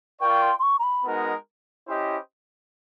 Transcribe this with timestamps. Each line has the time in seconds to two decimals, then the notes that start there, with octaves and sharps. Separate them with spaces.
0.21 F4 A#4 D5 G5 C#6
0.42 C6
0.59 C6
0.63 C#6
0.79 A#5
0.83 B5
1.05 G#3 B3 D#4 F#4 A#4
1.88 C#4 E4 G4 C5 D#5